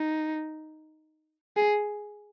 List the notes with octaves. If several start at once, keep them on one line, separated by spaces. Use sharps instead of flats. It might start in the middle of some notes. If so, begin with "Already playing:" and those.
Already playing: D#4
G#4